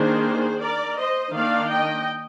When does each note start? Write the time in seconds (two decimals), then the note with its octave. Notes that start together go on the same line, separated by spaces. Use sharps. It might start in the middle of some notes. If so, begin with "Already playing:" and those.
Already playing: D#3 A#3 D4 G#4 C5
0.60 A#4 D5
0.97 C5 D#5
1.34 D#3 A#3 D4 D5 F5
1.70 D#5 G5